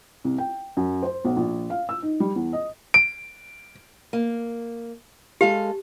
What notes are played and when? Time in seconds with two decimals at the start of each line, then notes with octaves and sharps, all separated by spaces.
0.24 C2
0.38 G5
0.77 F#2
1.03 C5
1.25 B1
1.36 A#1
1.70 F5
1.89 E6
2.02 D#4
2.20 G3
2.36 E2
2.53 D#5
2.94 D7
4.13 A#3
5.41 G#3 G4 A4 F5